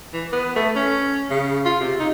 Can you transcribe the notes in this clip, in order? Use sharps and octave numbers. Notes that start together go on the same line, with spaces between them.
E3
B3
A3
C#4
C#3
F4
C3
D#4